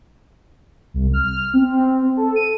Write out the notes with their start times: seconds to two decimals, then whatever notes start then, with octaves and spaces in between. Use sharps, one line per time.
0.94 C2
1.13 F6
1.53 C4
2.17 A4
2.36 D#7